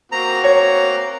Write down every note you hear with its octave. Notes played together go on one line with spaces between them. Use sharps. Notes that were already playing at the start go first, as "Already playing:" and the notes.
A#3 C4 F#4 A#5
C#5 A#5